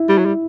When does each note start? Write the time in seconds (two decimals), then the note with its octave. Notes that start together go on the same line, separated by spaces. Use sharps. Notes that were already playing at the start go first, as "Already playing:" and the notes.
Already playing: E4
0.09 G3
0.18 F#3
0.25 G3